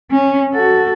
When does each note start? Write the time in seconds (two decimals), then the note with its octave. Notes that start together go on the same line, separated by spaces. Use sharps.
0.11 C#4
0.53 F#4 A4